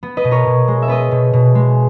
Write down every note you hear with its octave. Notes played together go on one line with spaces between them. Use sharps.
B3
B4 D#5
B2
A#4 C#5
B2
G#3
E5
B3 B4 D#5
B2
B2
G#3